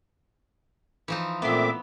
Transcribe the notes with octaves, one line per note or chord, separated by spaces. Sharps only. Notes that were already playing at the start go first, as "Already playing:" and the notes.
E3 F3 D#4
A#2 A3 B3 C4 E5 C6 D6